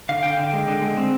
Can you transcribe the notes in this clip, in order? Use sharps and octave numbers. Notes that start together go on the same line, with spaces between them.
D3 F5
D3 G5
D3
G#3
D3
G#3
C4